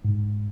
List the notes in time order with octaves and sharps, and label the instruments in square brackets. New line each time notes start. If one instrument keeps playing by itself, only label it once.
[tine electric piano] G#2